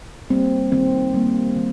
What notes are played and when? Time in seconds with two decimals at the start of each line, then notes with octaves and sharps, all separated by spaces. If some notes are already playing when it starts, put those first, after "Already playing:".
0.30 G3 A#3 C4
0.72 D#3 C4
1.14 G3 A#3
1.56 D#3